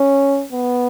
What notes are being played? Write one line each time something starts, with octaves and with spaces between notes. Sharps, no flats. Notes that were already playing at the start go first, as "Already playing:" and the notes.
Already playing: C#4
B3